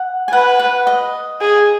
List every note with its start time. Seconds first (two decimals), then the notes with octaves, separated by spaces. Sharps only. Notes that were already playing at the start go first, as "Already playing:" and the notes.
Already playing: F#5
0.28 G#5
0.33 B4 F#5
0.59 F#5
0.87 D#5
1.41 G#4